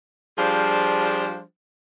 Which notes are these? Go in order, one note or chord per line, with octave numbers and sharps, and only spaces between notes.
F3 G3 D4 F4 G#4 C5